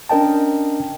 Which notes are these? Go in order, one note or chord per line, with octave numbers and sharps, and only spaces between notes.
C#4 D4 A#4 D#5 G5 A5